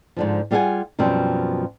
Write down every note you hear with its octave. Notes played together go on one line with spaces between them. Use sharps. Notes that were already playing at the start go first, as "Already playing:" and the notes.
G#2 D3 F3
G3 F4 G#4 F5 F#5 G#5
F#2 B2 F3 G3 C4